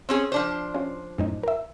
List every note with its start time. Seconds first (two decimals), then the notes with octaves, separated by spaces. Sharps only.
0.09 C4 C#4 G#4
0.32 F3 D4 C5
0.74 C#4 F4
1.18 F#2 A2 D#4
1.43 A#4 E5